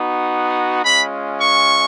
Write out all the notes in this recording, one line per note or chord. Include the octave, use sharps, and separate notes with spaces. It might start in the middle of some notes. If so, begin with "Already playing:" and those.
Already playing: B3 D#4 F#4
G#3 C#4 F4 B5
C#6